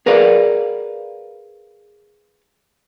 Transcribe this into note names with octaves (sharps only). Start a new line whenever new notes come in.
G#4 A#4 B4 D5 F5